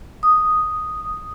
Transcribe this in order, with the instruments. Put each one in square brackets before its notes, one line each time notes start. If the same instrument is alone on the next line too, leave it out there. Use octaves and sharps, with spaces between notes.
[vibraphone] D#6